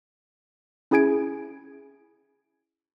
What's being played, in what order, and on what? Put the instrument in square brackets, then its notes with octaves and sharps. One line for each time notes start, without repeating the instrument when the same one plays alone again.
[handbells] C#4 E4 G#4 G#5 G#6 D7